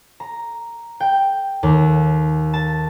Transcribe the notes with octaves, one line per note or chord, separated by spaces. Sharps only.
A#5
G5
D#2
A5